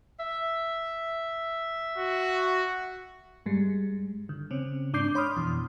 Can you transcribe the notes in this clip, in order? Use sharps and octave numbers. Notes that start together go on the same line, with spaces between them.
E5
F#4
G2 G3 G#3
D3
C#3 C4 C#4
G#2 D4 D6 G6 C7
C#5 B5 C6 D6 D#6 F6
F2 B2 E3